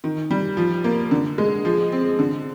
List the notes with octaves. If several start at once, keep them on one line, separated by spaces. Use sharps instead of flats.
D#3
G3
F3
A#3
D3
G#3
F3
C4
D3